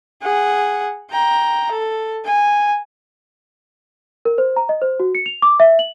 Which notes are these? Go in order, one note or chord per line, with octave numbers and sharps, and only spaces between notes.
G#4 F#5
G5 A#5
A4
G#5
A#4
C5
A#5
D#5
C5
F#4
C#7
F7
D6
E5
F#7